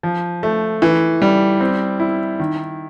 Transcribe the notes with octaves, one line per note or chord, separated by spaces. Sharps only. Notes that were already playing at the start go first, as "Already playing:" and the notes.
F3
A3
E3
G3
C4
E4
D#3